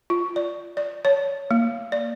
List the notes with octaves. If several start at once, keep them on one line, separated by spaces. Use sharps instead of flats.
F4
D5
D5
C#5
A#3
D5